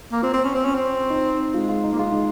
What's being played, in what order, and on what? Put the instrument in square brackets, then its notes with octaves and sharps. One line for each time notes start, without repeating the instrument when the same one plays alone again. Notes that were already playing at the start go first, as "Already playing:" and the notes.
[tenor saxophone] A#3
[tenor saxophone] C4 [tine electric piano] F4
[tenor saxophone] C4
C#4
C4
C#4
C4
[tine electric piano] D#4
[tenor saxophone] G#3 [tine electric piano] F4
[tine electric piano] F4
D#4
[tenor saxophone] A#3
[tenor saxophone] G#3 [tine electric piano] F4
[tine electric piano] D#4